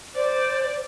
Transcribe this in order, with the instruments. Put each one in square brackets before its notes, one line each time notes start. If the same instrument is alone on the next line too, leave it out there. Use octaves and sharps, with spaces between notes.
[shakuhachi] C5 [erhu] D5